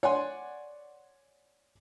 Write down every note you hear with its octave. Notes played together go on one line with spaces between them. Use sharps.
C#5 D5 F#5 G#5 C6